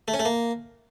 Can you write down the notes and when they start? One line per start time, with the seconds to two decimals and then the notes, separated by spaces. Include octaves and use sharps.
0.08 A3
0.14 C#4
0.20 A3
0.25 A#3